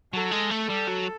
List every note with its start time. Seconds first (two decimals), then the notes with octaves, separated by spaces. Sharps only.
0.13 F#3 A4
0.32 G#3
0.51 A3
0.70 G3
0.89 F#3